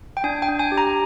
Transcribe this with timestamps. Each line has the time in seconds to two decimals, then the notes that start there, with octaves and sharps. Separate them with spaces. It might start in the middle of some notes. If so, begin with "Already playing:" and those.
0.17 G5
0.24 D4 G#5
0.42 G5
0.48 D4
0.59 G#5
0.72 G4
0.78 A#5